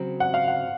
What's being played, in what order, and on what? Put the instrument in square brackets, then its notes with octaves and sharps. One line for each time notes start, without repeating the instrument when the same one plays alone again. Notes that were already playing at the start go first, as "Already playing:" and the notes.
Already playing: [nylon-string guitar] C#3 F#3 C4 F#4
[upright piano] F#5
F5
F#5